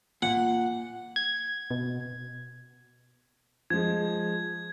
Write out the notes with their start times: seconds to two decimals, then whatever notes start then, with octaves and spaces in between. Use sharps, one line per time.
0.22 A#2 F#5
1.16 G#6
1.71 B2
3.70 F3 G#3 G#6